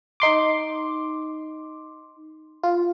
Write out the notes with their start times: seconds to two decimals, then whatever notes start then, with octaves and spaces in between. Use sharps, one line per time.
0.20 D#4 C6 D6
2.63 F4